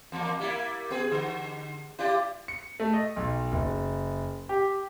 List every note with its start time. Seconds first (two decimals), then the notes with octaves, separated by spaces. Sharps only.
0.12 E2 A#3
0.40 G3 A#3 E4
0.90 B3 G#4
1.11 D3
1.99 E4 G4 D5
2.48 C#7
2.80 A3
2.93 D#5
3.16 B1
3.52 F#1
4.49 G4